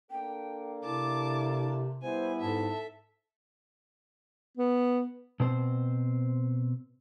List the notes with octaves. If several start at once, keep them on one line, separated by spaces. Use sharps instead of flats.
A#3 D4 A4 G5
C3 E4 A5 D6
G3 B3 E4 C5 G#5
G#2 A4 E5 A5
B3
B2 C4 C5